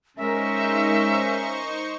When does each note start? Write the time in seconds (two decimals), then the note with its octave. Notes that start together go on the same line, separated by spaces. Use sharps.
0.17 G#3 C#4 D#4 A#4 C5 E5 C#6